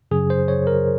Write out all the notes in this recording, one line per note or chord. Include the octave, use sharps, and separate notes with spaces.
F#2 C#3 F#3 G#4
C5
C#5
A#4